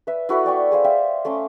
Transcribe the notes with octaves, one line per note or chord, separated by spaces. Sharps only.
B4 E5
E4 F#4 A4 B4
B3 D5 G5 C#6
G#4 C5 F5
E5 F5 G5
A3 C#4 C6 D6